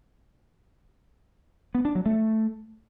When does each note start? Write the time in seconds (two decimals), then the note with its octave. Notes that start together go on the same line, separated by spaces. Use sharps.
1.75 B3
1.85 D4
1.95 F#3
2.06 A3